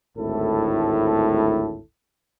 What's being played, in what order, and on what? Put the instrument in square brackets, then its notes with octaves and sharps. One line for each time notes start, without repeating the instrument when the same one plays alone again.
[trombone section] G#1 D2 A2 E4 A4